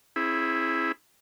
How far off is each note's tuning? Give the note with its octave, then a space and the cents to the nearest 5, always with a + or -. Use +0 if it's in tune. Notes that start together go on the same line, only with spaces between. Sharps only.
C4 +35 E4 +0 G#4 +0